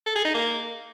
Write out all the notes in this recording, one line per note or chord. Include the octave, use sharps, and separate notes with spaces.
A4
G#4
D#4
A#3